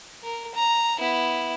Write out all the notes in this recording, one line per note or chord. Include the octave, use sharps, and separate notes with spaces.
A#4
A#5
B3 E4